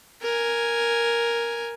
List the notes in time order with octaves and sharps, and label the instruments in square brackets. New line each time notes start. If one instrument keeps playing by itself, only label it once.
[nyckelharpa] A#4 G#5